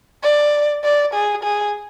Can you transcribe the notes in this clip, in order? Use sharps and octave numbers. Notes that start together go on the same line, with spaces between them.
D5
D5
G#4
G#4